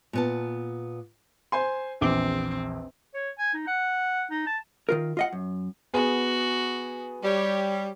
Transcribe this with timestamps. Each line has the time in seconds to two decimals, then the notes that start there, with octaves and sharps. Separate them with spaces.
0.13 A#2 B3 A5
1.52 C5 G#5 C6
2.01 A#1 E2 C4 D6
3.14 C#5
3.38 G#5
3.54 D#4
3.67 F#5
4.30 D#4
4.47 A5
4.89 D#3 F4 A#4
5.17 F4 D#5 F#5
5.33 F#2
5.94 B3 F#4 G#4
7.23 G3 G4 C#5